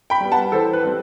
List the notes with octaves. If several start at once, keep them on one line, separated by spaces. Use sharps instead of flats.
G5 B5
G3 B3
F#5 A5
E3 A4 C5
B4
G3 C4